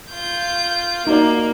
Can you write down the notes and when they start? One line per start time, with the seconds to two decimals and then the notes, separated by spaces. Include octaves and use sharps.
0.11 F4 G6
1.07 A#3 D#4 F#4 D5